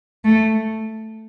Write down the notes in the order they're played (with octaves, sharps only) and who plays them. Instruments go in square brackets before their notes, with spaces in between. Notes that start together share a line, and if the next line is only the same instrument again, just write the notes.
[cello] A3